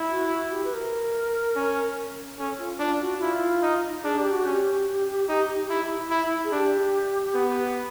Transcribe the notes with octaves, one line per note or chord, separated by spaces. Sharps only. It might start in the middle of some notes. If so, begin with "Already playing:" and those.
Already playing: E4
F#4
F#4
F#4
G4
B4
A#4
C#4
C#4 A4
F4
D4 F4
F#4
E4 F4
D#4
D4 G#4
G4
F#4
C#4 G4
D#4
E4
E4
G#4
D4 G4
B3